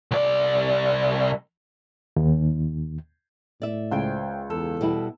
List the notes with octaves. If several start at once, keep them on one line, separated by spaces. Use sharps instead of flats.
C2 D5
D#2
A2 D5 E5
C#2 C5 G5 G#5
E2 A4
B2 G3 E4